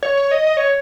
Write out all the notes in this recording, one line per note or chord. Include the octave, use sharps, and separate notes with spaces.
C#5
C#5
D#5
D#5
C#5